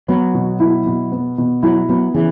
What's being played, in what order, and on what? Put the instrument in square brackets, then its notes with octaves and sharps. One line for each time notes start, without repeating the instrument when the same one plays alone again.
[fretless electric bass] F#3 [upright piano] B3
[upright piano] B2
E4
B2
B3
B2
[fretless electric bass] F#3 [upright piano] E4
[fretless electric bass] F#3 [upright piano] B3
[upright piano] C#3 [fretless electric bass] E3